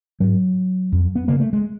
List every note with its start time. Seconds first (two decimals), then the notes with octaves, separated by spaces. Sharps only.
0.20 G#2 F#3
0.92 F2
1.15 B3
1.28 C#3 A#3
1.40 A3
1.53 G#3